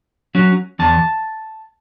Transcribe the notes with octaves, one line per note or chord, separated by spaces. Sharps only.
F#3 C#4
E2 A5